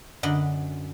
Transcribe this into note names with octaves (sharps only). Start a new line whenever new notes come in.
F#2 D3 D#5 B5